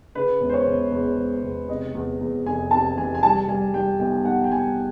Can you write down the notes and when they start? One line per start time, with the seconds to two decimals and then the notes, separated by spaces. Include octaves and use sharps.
0.15 C#3 B4
0.41 E1
0.49 C5
0.53 C#5
0.67 E1
0.92 E2
1.17 E1
1.43 E2
1.68 C3 D#5
1.95 E2
2.21 E2
2.45 F1 G#5
2.71 C3 A5
2.97 E3 G#5
3.15 G#5
3.23 G3 A5
3.48 G3 G#5
3.74 G3 G5
3.99 B1 G5
4.25 B1 F#5
4.44 G5
4.51 B1 G#5